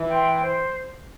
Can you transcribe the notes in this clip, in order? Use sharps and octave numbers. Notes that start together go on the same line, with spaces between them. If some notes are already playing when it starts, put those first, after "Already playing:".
Already playing: E3
G5 C6
C5